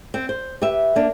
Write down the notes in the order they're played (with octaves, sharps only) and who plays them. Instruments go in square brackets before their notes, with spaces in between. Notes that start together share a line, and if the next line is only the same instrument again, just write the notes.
[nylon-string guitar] C4
C5
G4 B4 E5
A#3 D4